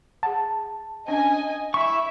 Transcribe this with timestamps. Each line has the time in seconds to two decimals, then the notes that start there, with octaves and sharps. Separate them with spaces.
0.23 G#4 F#5 A5
1.08 C#4 D4 D#5 G#5
1.74 E4 E5 C#6